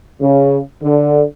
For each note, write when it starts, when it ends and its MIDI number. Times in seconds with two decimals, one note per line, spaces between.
0.21 0.59 49
0.82 1.23 50